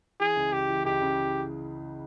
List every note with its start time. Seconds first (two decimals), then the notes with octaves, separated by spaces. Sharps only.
0.20 E3 G#4
0.36 C#2
0.52 C#2 G4
0.69 E3
0.85 C#2 G4
1.02 C#3